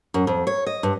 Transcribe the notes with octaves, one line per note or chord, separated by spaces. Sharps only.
F#2
F2
C#5
D#5
G2